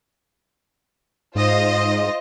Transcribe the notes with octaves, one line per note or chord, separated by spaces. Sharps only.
G#2 F4 C5 D#5